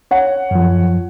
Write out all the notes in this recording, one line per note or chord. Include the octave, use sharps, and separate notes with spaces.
C#5 F#5
F#2 F3